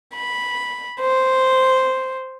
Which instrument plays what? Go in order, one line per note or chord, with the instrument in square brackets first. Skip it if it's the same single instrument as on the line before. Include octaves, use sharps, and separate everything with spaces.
[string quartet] B5
C5